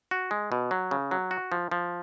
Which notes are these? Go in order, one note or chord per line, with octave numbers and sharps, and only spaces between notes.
F#4
G#3
B2
F#3
C#3
F#3
F#4
F3
F3